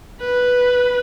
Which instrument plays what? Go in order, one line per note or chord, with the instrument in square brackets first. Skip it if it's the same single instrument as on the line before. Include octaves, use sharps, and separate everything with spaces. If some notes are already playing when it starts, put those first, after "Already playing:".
[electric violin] B4